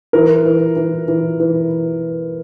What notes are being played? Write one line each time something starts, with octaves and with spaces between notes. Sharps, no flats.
E3 A#4
E3
E3
E3
E3